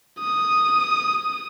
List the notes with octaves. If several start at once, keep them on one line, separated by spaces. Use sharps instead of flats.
D#6